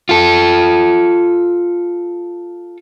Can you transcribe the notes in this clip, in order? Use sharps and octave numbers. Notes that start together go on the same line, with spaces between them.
F4 A4